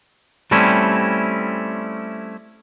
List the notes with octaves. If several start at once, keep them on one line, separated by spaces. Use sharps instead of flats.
G3 A3 C4 C#4 E4